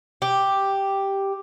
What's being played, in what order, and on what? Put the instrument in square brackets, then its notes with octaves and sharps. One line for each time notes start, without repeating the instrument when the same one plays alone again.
[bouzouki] G4